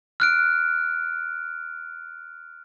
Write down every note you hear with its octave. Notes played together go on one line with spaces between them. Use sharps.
F6 F#6 D7